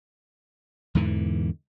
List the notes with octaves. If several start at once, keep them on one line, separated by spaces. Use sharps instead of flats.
E2 G#2 D3 E3